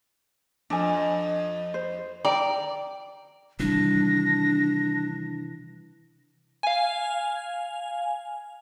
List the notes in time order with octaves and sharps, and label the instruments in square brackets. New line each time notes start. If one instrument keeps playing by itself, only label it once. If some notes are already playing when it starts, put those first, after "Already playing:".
[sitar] F2 [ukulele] D4 G#5
[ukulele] C5
[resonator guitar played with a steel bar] D5 [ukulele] G5 A#5
[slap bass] C3 E3 [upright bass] D#3 G3 [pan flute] D4 [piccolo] A#6
[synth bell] F5 G#5